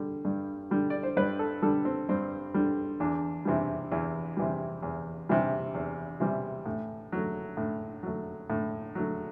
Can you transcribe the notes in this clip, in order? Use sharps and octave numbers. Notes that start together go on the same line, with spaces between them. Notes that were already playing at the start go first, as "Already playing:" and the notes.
Already playing: D3 G3
G2
D3 G3
D5
C5
G2 B4
A4
D3 G3 A4
C4
G2 C4
D3 G3
E2 D4
C3 E3 G3
E2 E4
C3 E3 G3
E2
C3 E3 G3
E2
C3 E3 G3
A2
F#3 A3
A2
F#3 A3
A2
F#3 A3